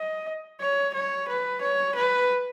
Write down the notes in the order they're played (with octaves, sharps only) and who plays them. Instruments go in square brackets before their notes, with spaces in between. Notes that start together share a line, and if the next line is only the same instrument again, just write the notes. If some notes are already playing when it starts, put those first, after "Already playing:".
Already playing: [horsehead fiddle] D#5
C#5
C#5
B4
C#5
B4